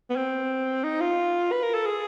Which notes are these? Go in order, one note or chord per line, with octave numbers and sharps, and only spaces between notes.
B3
C4
D#4
F4
B4
A#4
A4
G#4